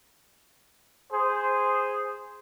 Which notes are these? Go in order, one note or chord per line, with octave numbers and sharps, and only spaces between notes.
G#4 C5